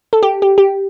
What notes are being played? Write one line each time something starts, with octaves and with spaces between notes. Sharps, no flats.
A4
G4
G4
G4